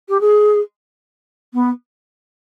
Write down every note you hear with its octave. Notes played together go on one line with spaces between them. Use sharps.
G4
G#4
B3